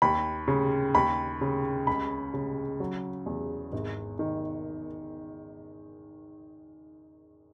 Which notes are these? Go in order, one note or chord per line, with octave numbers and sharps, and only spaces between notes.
D#2 B5
C#3
D#2 B5
C#3
C#2 B5
C#3
F#3
E2
G#1
D#3